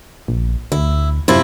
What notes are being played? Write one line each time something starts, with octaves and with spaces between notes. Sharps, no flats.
A#1
D2 E4
F#2 C3 F3 E4